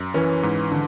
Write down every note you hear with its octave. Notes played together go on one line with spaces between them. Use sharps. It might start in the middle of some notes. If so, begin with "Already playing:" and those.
Already playing: F#2
E3 C#4
G#2
D3